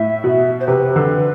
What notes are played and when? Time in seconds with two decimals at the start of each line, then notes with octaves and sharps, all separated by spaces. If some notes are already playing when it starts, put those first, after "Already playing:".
Already playing: A2 E5
0.24 B2
0.60 C5
0.68 C3 B4
0.96 D3